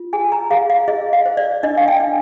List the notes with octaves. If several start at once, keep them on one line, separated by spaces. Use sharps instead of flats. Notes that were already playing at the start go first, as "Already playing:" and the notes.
Already playing: F4
G#4 G#5
A#5
G#4 F5
F5
G#4 D#5
F5
C5
D5
D4 D#5
F5
G5
D4